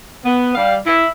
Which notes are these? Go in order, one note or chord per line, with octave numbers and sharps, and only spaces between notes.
B3
G3 F5
E4